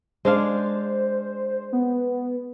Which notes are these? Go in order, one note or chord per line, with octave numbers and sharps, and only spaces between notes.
G#3 D4 C5 F5
B3